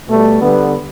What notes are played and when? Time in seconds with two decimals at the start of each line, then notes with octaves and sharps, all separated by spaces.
0.08 B2 G3 A3
0.41 D3 G3 B3